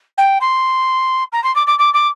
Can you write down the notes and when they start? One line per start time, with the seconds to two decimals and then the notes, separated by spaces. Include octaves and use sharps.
0.17 G5
0.41 C6
1.32 A#5
1.44 C6
1.55 D6
1.67 D6
1.79 D6
1.94 D6